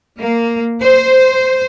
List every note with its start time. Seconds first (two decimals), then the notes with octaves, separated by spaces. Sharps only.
0.18 A#3
0.82 C5